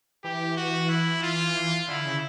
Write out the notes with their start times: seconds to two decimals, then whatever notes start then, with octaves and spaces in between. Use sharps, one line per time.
0.24 E3 G4
0.57 F#4
0.89 E4
1.23 F4
1.88 D3 E4
2.05 C#3